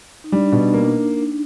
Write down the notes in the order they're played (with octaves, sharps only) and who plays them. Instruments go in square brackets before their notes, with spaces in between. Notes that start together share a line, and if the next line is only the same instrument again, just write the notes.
[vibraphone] D#4
[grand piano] G3 [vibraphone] D4
[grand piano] B2
A#3